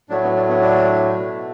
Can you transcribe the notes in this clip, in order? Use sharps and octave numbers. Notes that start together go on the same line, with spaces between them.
A2 F#3 A3 D4
B3
D4
B3
D4
B2 A3